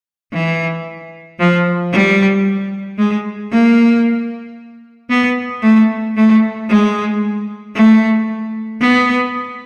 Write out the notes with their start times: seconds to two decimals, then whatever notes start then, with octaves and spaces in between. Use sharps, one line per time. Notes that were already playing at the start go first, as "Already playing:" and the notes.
0.33 E3
1.39 F3
1.92 G3
2.98 G#3
3.51 A#3
5.10 B3
5.62 A3
6.16 A3
6.69 G#3
7.75 A3
8.81 B3